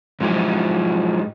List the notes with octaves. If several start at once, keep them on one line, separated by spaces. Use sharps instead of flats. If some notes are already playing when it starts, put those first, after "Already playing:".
G#2 F3 F#3 E4 G4